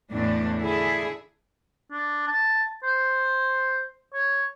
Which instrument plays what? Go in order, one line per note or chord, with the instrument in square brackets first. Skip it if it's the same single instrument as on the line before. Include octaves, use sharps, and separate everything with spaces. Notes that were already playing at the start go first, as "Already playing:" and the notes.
[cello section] E2 A2 D4
D3 E4 G#4
[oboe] D4
A5
C5
C#5